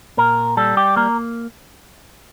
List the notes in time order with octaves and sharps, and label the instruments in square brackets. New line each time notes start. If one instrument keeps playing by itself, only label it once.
[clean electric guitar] A#2 A#4
G3 A4
G4
A#3 A#4